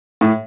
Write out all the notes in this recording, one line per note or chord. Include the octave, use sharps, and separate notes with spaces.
A2